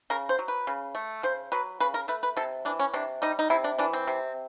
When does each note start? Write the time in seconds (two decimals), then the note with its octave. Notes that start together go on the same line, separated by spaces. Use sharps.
0.10 C#3 A#4
0.29 C5
0.39 F#3
0.48 B4
0.67 C#3
0.95 A3
1.23 C#3 C5
1.52 F#3 B4
1.80 C#3 B4
1.94 A#4
2.08 A3 B4
2.23 B4
2.37 C3 A4
2.65 E3 D4
2.79 C#4
2.94 C3 D4
3.22 G3 D#4
3.39 D#4
3.50 C3 E4
3.64 D4
3.79 E3 D4
3.93 C4
4.07 C3